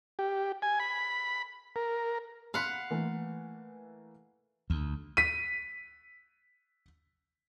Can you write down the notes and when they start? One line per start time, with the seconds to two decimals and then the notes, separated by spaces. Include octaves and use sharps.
0.19 G4
0.62 G#5
0.80 B5
1.76 A#4
2.54 F5 F#5 B5 C6 B6
2.90 E3 A3 A#3
4.70 D2
5.17 B6 D#7